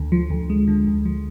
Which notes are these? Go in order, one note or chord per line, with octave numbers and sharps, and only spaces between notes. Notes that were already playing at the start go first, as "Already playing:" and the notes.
Already playing: D2 D3
F3
D2
G#3
D3
D2
F3